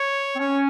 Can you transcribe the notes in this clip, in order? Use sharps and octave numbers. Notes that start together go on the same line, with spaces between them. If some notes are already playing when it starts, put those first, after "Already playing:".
Already playing: C#5
C4
C#4 C#5